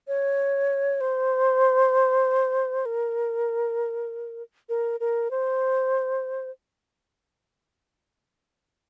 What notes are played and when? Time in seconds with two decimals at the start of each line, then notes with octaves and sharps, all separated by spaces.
0.08 C#5
1.01 C5
2.86 A#4
4.69 A#4
5.00 A#4
5.31 C5